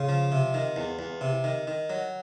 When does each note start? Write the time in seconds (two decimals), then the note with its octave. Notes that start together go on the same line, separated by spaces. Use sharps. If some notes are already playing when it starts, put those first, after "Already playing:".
Already playing: C#3 F4
0.09 F3
0.32 C3
0.54 D#3
0.76 E2
0.99 E2
1.21 C3
1.44 D#3
1.67 D#3
1.90 F#3